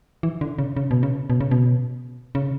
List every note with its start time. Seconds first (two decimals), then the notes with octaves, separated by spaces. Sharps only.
0.23 E3
0.41 D3
0.58 C#3
0.77 C#3
0.91 B2
1.03 C#3
1.30 B2
1.41 C#3
1.51 B2
2.35 C#3